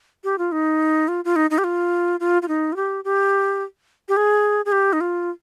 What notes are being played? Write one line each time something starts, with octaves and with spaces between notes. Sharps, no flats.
G4
F4
D#4
F4
F4
D#4
D#4
G4
F4
F4
F4
D#4
F4
G4
G4
G4
G#4
G#4
G4
D#4
F4